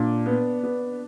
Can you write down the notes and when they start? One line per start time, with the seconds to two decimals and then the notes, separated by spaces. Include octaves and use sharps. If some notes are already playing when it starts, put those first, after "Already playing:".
Already playing: A#2 D4
0.26 B3
0.63 B3